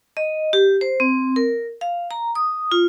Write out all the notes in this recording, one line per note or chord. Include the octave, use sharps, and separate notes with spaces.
D#5
G4
C5
C4
A#4
F5
A#5
D#6
F4